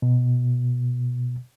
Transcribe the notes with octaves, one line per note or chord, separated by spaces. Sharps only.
B2